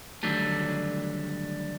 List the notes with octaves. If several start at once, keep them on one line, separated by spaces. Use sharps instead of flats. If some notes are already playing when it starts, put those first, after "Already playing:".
D3 D#3 F#3 G3 A3